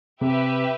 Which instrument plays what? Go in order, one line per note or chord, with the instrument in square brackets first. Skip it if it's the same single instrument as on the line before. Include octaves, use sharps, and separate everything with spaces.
[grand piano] C3 [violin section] G4 B4 E5